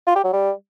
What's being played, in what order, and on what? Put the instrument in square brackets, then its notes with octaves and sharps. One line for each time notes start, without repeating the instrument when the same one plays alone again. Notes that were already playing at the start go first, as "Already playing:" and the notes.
[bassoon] F4
G4
F#3
G3